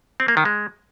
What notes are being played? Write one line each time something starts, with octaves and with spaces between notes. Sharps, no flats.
C4
A#3
D#3
G#3